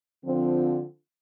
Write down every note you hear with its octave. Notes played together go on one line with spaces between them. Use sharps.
D3 F3 C4 F4